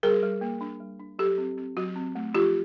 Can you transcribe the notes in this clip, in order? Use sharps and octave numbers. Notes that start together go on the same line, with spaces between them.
G3 G#4 A#4
G3
A#3
D4
G3
D4
F#3 G4 A4
C4
C4
F#3 F#4
C4
A3
F3 F4 G4